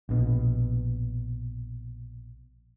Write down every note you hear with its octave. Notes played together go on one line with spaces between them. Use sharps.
A#1 B2